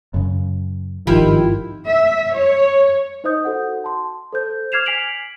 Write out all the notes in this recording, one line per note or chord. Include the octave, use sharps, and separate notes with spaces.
F#2 C#3
G#1 G2 D#3 F3 E4 F4 G4
E5
C#5
D#4 C5 D#5 D#6 G6
F#4 A4 F#5
A5 C6
A4 C5 G6
D6 F6 G#6 C7 E7 F7
G#5 B6 C7 D7 F7 F#7